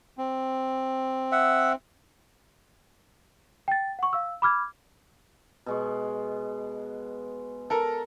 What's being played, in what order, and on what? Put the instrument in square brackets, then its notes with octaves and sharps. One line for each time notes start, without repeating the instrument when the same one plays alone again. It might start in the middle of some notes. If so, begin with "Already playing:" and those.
[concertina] C4
[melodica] E5 F#5
[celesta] G5 A6
F#5 C#6
F5 E6
B5 D6 F6 G#6
[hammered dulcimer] B2 G#3 C#6
[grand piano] A4 A#4 A#5